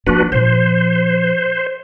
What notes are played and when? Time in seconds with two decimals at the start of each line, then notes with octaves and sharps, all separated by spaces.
0.07 F3 A#3 D4 F#4 B4
0.32 A#2 F3 C5